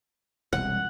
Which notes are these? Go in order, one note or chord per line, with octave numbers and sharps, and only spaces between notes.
E1 C2 F#5